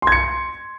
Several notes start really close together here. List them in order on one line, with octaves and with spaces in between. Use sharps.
C6 G#6 C#7